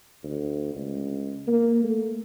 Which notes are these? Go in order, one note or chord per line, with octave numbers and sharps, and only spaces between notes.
D2
C#2
A#3
A3